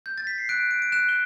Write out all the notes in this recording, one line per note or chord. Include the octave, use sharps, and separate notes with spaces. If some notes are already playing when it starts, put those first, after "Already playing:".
G6
A6
B6
C7
F#6 D7
D7
D7
F#6 E7
G7